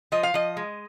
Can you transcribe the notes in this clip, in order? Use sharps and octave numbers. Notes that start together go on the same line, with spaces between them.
F3 D#5
F5
F3 D#5
G#3